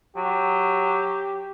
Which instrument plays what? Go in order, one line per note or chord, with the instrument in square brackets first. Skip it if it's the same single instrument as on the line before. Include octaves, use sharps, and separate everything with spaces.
[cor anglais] F#3 [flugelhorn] G4